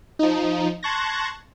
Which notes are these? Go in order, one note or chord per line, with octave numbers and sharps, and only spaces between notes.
F3 D#4
A5 C6 C#6 F#6 G#6 A#6